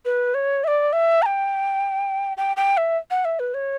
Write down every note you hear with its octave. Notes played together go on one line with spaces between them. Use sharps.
B4
C#5
E5
D5
E5
A#5
G5
G5
G5
E5
F#5
E5
B4
C#5